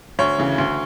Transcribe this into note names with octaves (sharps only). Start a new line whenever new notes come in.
D2 C#5
C#3 E3
D2